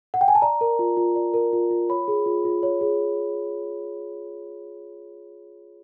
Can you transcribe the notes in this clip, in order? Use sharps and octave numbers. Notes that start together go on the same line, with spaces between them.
F#5
G5
G#5
A5
D5 A#5
A#4
F4
F4
D5
A#4
F4
F4
C#5 B5
G#4
F4
F4
C#5
G#4